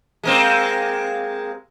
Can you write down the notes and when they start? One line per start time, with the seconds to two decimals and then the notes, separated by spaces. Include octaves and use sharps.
0.23 G#3 A#3 C4